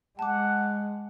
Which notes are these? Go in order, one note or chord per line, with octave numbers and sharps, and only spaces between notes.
G#3 F#5 A5 D6